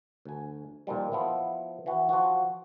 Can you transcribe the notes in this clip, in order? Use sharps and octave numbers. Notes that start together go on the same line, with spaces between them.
D2 G#5
A#2 D#3 F3 G3
F3 B3 E4
E3 F#4
F3 F#4